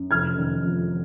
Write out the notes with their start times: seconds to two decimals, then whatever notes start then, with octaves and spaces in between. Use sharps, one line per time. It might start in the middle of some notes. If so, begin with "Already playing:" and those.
Already playing: F#2
0.11 F1 F6 G#6
0.38 D#3
0.63 F2